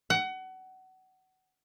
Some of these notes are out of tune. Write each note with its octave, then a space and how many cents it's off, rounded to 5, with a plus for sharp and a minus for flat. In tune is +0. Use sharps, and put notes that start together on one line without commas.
F#5 +25